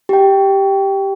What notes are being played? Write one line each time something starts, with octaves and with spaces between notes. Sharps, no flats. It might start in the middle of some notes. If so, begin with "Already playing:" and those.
G4 G5